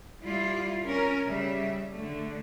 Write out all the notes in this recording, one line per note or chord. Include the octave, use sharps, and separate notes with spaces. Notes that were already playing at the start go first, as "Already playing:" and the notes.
G3 E4 F4
C#4 A#4
C#3 G3 E5
D3 A3